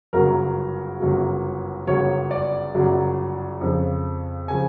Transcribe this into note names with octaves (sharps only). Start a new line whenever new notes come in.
G1 F#2 C#3 F#3 A#4
G1 F#2 C#3 F#3
G1 F#2 C#3 F#3 C#5
D5
G1 F#2 C#3 F#3
F2 C#3 F3
C#3 F3 G#5